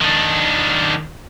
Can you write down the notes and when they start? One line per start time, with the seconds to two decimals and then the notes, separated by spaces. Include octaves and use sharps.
0.02 D#3 D4